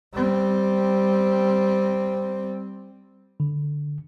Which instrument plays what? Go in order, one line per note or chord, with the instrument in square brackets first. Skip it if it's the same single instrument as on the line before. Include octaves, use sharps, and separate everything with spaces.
[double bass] G3 C4
[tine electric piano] D3